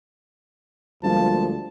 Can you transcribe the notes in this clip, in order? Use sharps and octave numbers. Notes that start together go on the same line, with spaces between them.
D2 F3 G3 G#3 A#3 A5